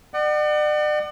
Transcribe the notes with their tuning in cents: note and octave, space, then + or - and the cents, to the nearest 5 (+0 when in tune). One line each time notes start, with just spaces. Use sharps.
D5 +40 F#5 +25